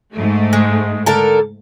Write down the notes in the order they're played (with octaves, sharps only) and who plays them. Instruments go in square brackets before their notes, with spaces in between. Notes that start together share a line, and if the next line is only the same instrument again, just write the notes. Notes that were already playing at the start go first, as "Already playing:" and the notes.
[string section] G#2 A3
[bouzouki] G#3
D3 A4 A#4